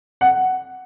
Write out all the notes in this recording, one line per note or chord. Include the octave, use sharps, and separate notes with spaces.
F#5